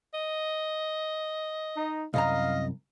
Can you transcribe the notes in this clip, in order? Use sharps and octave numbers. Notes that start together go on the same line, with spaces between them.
D#5
D#4
C2 F#2 D#5 F5 A#5